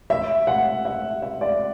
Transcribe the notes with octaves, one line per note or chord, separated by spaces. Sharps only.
E5
F#5
E5
E5
D5